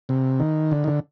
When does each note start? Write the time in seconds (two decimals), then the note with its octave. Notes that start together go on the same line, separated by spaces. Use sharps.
0.09 C3
0.40 D#3
0.71 D3
0.84 D#3
0.88 D3